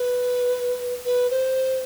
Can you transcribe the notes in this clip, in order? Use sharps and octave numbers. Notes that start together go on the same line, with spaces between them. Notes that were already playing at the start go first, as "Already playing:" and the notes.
Already playing: B4
B4
C5